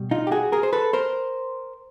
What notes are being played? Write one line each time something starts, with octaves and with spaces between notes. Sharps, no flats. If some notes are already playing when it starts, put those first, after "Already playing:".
Already playing: B2 G3
D#4 F4
G4
F#4 G#4
G#4 A#4
C5
A4 B4
A#4 C5